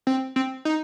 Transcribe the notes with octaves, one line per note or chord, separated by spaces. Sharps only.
C4
C4
D#4